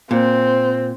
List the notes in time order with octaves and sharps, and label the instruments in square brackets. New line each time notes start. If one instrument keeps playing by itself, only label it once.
[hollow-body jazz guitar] A#2 [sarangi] C4